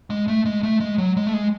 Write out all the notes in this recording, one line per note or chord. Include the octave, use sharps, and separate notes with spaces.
G#3
A3
G#3
A3
G#3
F#3
G#3
A3
G#3